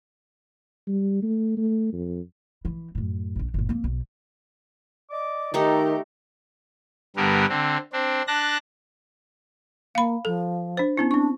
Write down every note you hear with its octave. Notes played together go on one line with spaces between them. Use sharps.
G3
A3
A3
F2
E3
F#2 A2
A#1 D4
G1 A#2
A#3 C4
B1
D5 D#5 D6
D#3 A3 D#4 G4 A4 A#5
G2 D3 G3 B3 A#4
D3 C4
C4 D4
D4 A5 F#6 A#6
A#3 F5 B5
F3 A4
D4 C5
B3 C#4 E4
C4 D4 C#6